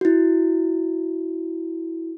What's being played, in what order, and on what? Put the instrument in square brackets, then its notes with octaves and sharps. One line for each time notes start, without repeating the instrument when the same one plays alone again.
[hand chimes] E4 F#4